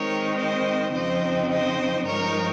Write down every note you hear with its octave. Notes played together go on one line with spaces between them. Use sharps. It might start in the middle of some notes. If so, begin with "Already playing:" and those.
Already playing: D#3 G#3 C4 D#4 A#4 C#5
C5 D#5
F2 C#3 F3 C4 D#4 C5 D#5
C5 D#5
G2 F3 G#3 D#4 A#4 C#5